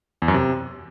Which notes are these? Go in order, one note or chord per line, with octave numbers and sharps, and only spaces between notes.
E2
F#2
C3